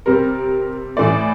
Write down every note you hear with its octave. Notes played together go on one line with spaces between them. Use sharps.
C3 G3 C4 A#4
A2 E3 A3 D5